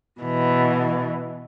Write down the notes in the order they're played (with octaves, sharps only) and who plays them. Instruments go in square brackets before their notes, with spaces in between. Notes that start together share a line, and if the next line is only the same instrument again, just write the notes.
[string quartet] B2 E3